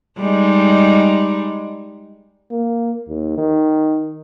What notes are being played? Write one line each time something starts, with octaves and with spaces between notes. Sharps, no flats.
G3 G#3 D#4
A#3
D#2
D#3